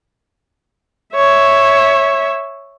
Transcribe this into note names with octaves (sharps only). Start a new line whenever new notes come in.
C#5 E5